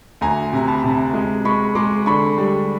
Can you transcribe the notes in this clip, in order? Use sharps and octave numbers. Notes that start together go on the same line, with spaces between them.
D2 G#5 A#5
C3 A#5
A5 B5
C3
G#3
G#3 B5 C#6
G#3 C6 D6
D3 B5 C#6
G3